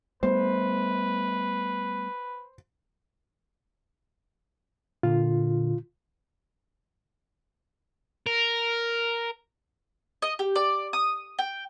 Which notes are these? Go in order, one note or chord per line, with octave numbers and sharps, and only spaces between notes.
G3 A3 B3 B4 C5
A#2 D3 F4
A#4
D#5
G4
D5
D#6
G5